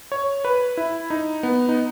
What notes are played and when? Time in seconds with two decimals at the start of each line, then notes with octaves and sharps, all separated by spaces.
0.12 C#5
0.45 B4
0.77 E4
1.10 D#4
1.43 B3
1.69 D#4